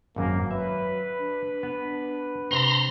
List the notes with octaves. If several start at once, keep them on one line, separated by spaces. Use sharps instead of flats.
G#1 F#2 F#3 A#3
B4 E5
D4
B3
C3 C4 A#5 C6